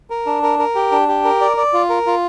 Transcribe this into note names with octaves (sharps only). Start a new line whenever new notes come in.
A#4
D4
A#4
A#4
G4
D4
G4
A#4
D5
D5
F4
A#4
F4